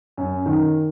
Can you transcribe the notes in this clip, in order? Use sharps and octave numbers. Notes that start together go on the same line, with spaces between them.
F#2
D#3